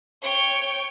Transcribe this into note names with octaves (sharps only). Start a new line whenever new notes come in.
C#5 G5